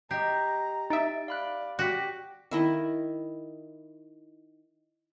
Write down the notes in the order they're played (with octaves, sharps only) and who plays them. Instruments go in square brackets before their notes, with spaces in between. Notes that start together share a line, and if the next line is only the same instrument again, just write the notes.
[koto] G4 [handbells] D#5 C7 [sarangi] A#5
[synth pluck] D#4 E5 [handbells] A6 D7
[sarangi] D5 [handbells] F5 B5 F#6
[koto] F#4 [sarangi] G4 [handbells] D6 A#6 B6
[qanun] D#3 E4 D#5